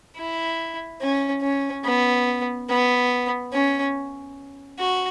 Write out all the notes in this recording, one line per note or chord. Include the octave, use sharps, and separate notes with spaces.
E4
C#4
C#4
B3
B3
C#4
F#4